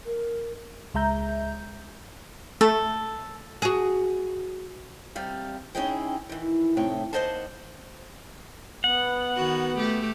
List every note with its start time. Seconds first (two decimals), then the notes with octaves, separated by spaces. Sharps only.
0.06 A#4
0.94 C#2 G#3 E5 A#5 G6
2.61 A3 A4
3.62 F#4 G#4
5.15 C3 G3 F5
5.75 C#4 D#4 E4 G#4 D#5 G5
6.29 D#3 E3
6.77 A2 C3 A3 D#4 C#5 G5
7.13 D#2 G#2 C5 D#5 F#5 A5
8.84 B3 F#5
9.36 D#3 F#4
9.77 A3 G4